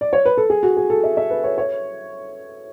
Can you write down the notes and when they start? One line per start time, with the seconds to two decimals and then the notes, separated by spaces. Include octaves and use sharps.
0.01 D5
0.13 C#5
0.25 B4
0.37 A4
0.50 G#4
0.63 F#4
0.77 G#4
0.90 A4
1.04 E5
1.17 E5
1.30 B4
1.44 C#5
1.58 C#5